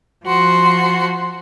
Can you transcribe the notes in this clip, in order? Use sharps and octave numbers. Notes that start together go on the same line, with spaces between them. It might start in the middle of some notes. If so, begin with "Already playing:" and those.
F3 F#4 C6